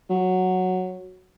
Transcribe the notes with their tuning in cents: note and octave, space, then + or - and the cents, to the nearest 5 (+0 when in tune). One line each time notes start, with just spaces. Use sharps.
F#3 -5